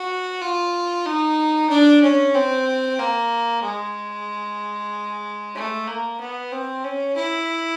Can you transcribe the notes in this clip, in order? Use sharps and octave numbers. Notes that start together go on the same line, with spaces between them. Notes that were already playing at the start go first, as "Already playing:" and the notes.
Already playing: F#4
F4
D#4
D4
C#4
C4
A#3
G#3
A3
A#3
B3
C4
C#4
E4